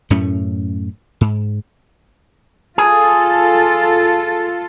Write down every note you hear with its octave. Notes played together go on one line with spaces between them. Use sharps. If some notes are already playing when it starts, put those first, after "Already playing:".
F#2 A2 A3 C#4
G#2
F4 G#4 A4